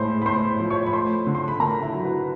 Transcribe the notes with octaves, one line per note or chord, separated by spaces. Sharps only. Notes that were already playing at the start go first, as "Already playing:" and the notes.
Already playing: A2 G#3 C5 B5 C6
B5
A2 C5 C6
F3
C#5 C#6
B5
A3 C5 C6
D3
C6
B5
D3 A#4 A#5
E4 E5
F#3
B4